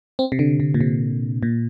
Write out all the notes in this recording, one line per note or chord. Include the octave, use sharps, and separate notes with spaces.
C4
C3
D3
C3
A#2
C3
A#2